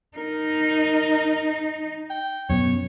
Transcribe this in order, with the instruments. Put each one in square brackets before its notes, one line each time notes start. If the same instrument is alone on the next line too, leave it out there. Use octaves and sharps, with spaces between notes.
[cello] D#4 [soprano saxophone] A#4
[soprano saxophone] G5
[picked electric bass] F#2 B2 [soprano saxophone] C#5